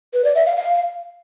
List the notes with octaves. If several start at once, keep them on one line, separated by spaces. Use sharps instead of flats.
B4
D5
E5
F5
F5